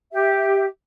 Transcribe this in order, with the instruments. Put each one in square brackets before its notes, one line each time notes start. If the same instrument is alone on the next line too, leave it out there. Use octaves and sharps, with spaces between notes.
[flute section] G4 E5